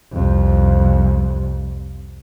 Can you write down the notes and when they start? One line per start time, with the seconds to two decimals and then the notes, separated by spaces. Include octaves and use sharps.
0.12 C2 F2